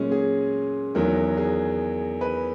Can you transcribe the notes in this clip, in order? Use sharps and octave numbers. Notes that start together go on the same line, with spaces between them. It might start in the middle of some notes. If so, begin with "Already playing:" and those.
Already playing: A#2 F#3 G#3 C#4 G#4
G#4
E2 D#3 F#3 A#4
A#4
G#4
B4